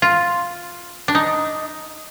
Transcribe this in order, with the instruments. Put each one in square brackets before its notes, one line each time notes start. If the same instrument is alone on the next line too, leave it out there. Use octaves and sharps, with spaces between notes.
[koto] F4
D4
D#4